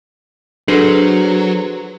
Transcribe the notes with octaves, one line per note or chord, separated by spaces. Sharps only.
F#3 D4 G#4 A4 B4 C5